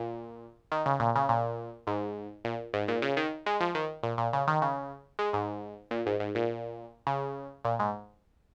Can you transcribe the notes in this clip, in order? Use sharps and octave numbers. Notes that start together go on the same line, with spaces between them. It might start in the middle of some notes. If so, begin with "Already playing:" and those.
Already playing: A#2
D#3
C#3
A#2
C#3
A#2
G#2
A#2
G#2
A#2
C#3
D#3
G#3
F3
D#3
A#2
A#2
C#3
D#3
C#3
G#3
G#2
A#2
G#2
G#2
A#2
C#3
A#2
G#2